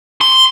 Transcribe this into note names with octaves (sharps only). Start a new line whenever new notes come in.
C6